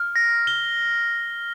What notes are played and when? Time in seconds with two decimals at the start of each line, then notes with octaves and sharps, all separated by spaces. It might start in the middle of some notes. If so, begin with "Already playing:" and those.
Already playing: F6
0.16 A#6
0.47 G7